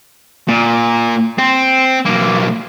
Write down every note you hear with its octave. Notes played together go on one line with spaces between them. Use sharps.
A#2
C4
B1 A#3